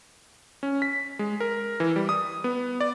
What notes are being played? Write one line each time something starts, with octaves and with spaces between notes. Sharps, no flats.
C#4
B6
G#3
A#4
E3
G3
D#6
B3
D5